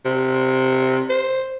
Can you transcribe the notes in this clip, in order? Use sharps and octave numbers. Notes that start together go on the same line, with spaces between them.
C3
C5